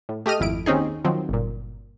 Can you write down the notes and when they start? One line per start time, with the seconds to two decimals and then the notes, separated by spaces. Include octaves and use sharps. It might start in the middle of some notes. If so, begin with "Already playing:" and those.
0.09 A2
0.26 A3 G4 D#5 F6 D#7
0.40 G#1 F2 E4 D7
0.66 D#2 C4 C#4 D#4 G#4
1.05 D#3 F3 F#3 C4
1.29 G1 A#2